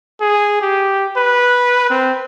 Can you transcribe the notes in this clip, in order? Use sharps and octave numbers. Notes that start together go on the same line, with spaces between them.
G#4
G4
B4
C4